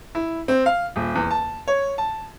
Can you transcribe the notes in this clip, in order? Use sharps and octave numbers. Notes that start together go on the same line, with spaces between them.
E4
C4
F5
D#1
E2
A5
C#5
A5